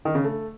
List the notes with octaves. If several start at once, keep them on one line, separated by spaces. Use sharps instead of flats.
D#3
C#3
A3